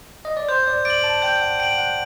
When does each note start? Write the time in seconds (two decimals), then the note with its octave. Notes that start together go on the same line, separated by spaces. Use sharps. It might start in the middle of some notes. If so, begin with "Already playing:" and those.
0.25 D#5
0.37 D5
0.49 C5 G6
0.67 D5
0.85 D5 D7 F#7
1.04 A5
1.22 G5 G6
1.41 F#5
1.59 G5 D7 F#7
1.78 F#5